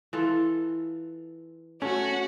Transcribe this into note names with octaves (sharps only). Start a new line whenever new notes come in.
E3 F4 A4
A3 C#4 F#4